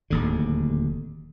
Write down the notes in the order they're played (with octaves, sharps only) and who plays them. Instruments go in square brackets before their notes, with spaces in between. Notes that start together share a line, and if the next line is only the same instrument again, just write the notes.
[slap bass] D1 D#2 D3